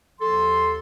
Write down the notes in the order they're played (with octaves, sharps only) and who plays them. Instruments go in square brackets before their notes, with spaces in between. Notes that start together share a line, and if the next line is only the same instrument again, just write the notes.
[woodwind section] D#2 F3 A4 C6